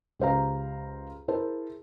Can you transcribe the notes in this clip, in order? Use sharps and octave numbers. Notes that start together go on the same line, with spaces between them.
C#2 G4 C5 F5 A#5
E4 G#4 A#4 C5 A5